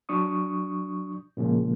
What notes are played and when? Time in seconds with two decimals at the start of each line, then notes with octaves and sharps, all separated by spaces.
0.09 F#3 D4 C#6 D#6
1.37 A#2 C#3 F3 G#3 A#3